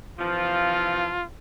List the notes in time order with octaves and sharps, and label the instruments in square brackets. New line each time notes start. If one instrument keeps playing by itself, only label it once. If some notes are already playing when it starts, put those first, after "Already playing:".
[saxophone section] C3 E3 F3 [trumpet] F4